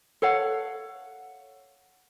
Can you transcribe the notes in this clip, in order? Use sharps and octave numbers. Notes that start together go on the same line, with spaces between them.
A4 C#5 F5 F#5